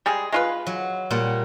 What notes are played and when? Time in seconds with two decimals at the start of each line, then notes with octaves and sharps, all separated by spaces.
0.06 G3 G#3 G#4
0.32 G#3 F4 B4
0.66 F#3
1.10 A#2 G3 F#5